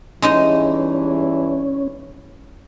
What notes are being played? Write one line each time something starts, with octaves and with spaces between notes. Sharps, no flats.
E2 G2 E3 G#3 C#4 D#4 D#5